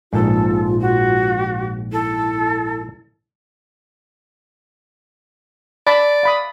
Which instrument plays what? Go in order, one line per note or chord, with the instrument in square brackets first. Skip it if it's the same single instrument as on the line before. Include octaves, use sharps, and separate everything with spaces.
[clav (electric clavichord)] A#1 G#2 [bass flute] F4 [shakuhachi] A4
[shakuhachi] F#4
[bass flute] E4 [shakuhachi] A4
[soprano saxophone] D5 [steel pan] A5 B5
[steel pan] F5 B5 D#6